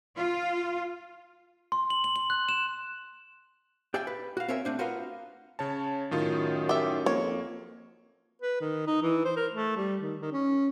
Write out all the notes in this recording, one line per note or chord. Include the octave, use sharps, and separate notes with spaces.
F4
C6
F#7
F#7
F#7
F#6
E7
G4 D5 E5 F5 G5 G#5
B4
F#4 F5
C4 A#4 C#5 E5 G#5
A3 C4 D4
F4 F#4 A#4 B4 D#5 F5
C#3 C#5 A5
F#2 A2 D#3 F4
G4 E5
F2 A#3 C#5
B4
D#3
D#4
E3
C5
A#4
A3
G3
D#3
D#3
C#4